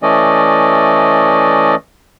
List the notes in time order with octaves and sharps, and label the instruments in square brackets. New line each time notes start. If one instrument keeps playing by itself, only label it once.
[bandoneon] E3 A3 C#4 D5 D#5